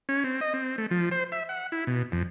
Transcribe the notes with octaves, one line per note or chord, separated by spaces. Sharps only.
C#4
C4
D#5
C4
A3
F3
C5
E5
F#5
E4
B2
F2